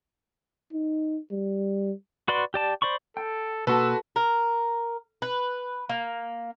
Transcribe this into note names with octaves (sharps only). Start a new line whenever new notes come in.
D#4
G3
F#4 B4 D5 C6
G4 D5 A5
C5 D5 B5 C#6
A4 G5
B2 A#3 F#4 A4 B4 C6 E6
A#4
B4
A#3